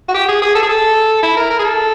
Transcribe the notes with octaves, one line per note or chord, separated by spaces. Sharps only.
F#4
G4
G#4
G#4
A4
G#4
A4
E4
A#4
A#4
G#4
A4